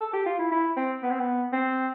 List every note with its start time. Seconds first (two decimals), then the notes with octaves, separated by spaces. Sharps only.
0.01 A4
0.13 G4
0.26 F4
0.39 E4
0.52 E4
0.77 C4
1.03 B3
1.10 C4
1.19 B3
1.53 C4